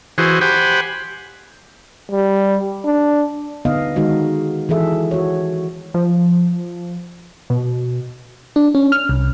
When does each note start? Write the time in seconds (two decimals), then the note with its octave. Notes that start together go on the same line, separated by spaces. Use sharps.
0.18 E3 F#4 G#4 C5
0.41 G4 C5 F#5 G#5 B5
2.11 G3
2.85 D4
3.65 D3 B3 D#4 D#5 F5
3.96 D#3 G#3 D#4 F#4 D#5
4.69 E3 G#4 A4 E5
5.11 F#4 C#5
5.94 F3
7.50 B2
8.56 D4
8.75 C#4
8.92 F6
9.09 C2